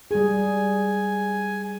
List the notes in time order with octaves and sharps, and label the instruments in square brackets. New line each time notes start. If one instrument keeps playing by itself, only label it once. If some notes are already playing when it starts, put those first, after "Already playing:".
[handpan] G3 G#4 [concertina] G#5